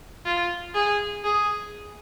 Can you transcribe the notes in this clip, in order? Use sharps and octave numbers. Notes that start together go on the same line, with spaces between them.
F4
G#4
G#4